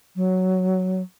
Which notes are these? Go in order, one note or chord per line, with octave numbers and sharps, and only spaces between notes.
F#3